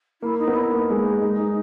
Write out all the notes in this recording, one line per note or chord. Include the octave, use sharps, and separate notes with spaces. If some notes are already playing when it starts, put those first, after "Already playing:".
A#3 E4
D#4
B3
E4
A#3 D#4 E4
G#3
A#3
G#3
G#3